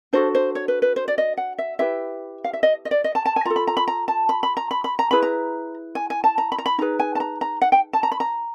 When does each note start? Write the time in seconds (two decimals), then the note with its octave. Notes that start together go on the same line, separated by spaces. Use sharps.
0.13 D4 F#4 A4 C5
0.35 C5
0.55 C#5
0.68 B4
0.82 B4
0.96 C5
1.08 D5
1.18 D#5
1.37 F#5
1.59 E5
1.79 E4 G4 B4 E5
2.44 F5
2.53 E5
2.63 D#5
2.85 D#5
2.91 D5
3.04 D#5
3.15 A5
3.26 A5
3.36 G#5
3.45 F4 A4 A#5
3.56 B5
3.67 A#5
3.77 B5
3.88 A#5
4.08 A5
4.29 B5
4.43 B5
4.57 A#5
4.71 B5
4.84 B5
4.99 A#5
5.11 E4 G#4 B4 B5
5.23 A#5
5.95 G#5
6.10 G#5
6.24 A5
6.38 A#5
6.52 B5
6.58 A#5
6.66 B5
6.78 D#4 G#4 B4 A#5
7.00 G#5
7.15 A5
7.20 A#5
7.41 A#5
7.62 F#5
7.72 G5
7.93 A5
8.03 A#5
8.12 B5
8.20 A#5